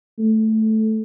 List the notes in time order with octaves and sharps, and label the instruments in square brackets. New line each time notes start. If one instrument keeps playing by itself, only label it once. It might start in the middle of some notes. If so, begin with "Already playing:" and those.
[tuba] A3